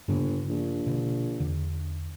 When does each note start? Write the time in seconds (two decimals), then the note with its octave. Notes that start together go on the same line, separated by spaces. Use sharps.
0.08 G1 G2 C#3 A#3
0.48 A#1
0.87 B2 D3
1.40 E2 D3